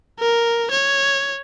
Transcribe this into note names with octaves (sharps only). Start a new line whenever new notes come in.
A#4
C#5